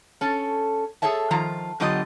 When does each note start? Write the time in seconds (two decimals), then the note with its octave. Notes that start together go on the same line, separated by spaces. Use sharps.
0.21 C#4 A4
1.02 G#4 A4 C#5 E5 A5
1.31 D#3 F3 F4 A#5
1.80 D3 F#3 B3 F4 G4 D#5